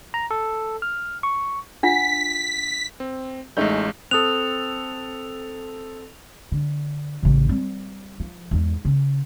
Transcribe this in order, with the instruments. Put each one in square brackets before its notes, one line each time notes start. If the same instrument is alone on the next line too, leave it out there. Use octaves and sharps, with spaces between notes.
[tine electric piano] A#5
A4
F6
C#6
[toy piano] D4 F4 F#5 [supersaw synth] B6
[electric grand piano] C4
[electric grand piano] A1 G#3 G6 [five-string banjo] A3 D#4
[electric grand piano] C4 A4 [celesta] D#6 F#6 [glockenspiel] F7
[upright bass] D3
A1 C#3
G3 C4
F3
E2 G#2
C#3